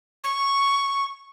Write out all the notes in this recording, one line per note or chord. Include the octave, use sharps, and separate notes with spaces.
C#6